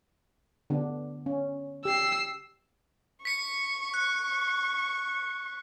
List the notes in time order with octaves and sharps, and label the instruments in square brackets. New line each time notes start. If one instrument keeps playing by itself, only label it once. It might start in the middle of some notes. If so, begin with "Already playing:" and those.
[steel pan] D3 B3 D4
C#4
[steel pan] G4 [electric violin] E6 C7
[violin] C#6 [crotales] B6 C#7
[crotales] F#6